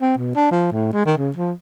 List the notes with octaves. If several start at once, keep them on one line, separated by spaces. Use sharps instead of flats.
C4
B2
D4
F3
A2
G#3
D#3
C#3
F3